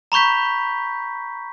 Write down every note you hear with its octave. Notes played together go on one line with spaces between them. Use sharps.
A#5 B5 C#6 G6 B6